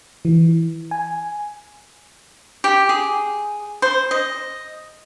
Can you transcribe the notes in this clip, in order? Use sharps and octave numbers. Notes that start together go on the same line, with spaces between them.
E3
G#5
G4
G#4
C5
D#5